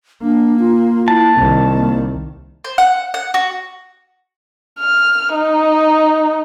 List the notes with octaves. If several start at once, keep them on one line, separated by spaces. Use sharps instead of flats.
A#3 D4
F4
E4 A5
C2 D#3 C4
A#3
C5
F#5
F#5
F#4
F6
D#4